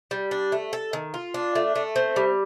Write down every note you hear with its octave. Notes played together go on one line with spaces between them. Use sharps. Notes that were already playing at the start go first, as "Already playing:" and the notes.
G3
D4
A3
A4
D#3
F4
D4
A3
A3
C4
G3